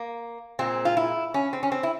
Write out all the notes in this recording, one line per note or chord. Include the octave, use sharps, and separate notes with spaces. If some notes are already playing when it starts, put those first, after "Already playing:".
Already playing: A#3
A#2 G#3 C4
F4
E4
C#4
C4
C#4
C4
E4